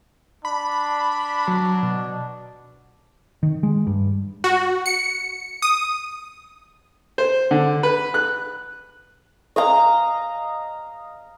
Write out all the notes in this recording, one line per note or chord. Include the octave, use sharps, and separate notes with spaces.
D4 B5
F#3
B2
D#3
G#3
G2
F#4
C#7
D#6
C5
D3
B4
F#6
D#5 F5 A#5